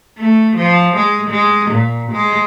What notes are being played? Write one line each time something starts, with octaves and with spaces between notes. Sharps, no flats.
A3
F3
G#3
G#3
A#2
G#3